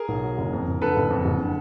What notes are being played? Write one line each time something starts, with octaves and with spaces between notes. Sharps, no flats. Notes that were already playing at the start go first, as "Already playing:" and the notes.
Already playing: G#4 A#4
B1
F#3
F#1
F2
F#1
D3 A4 B4
F#1
F2
F#1
D3